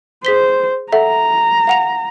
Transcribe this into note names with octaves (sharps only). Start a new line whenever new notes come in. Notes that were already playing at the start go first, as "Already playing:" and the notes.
G#4 C5 B6 G7
A4 E5 F#5 A#5
F5 F#5 F7